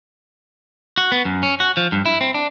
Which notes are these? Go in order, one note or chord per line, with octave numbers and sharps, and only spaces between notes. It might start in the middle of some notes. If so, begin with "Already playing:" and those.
F#4
B3
F#2
C#4
F#4
F3
G2
E4
C4
D4